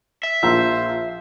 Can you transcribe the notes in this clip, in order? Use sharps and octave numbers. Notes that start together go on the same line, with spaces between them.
E5
A#1 F4 C5 A#5 E6